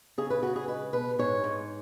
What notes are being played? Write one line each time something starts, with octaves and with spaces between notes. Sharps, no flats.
C#3 G#4
B4
C#3 F#4
G#4
G#3 B4
B2 B4
G#2 C#5
G#2